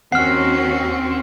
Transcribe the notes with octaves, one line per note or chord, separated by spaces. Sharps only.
D#2 C4 C#4 F#4 F#5 F6 C7